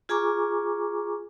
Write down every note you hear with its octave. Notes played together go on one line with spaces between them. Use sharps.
F4 G#4 G#5 A#5 C#6 D6